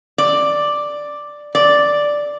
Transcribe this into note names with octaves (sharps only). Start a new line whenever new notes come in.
D5
D5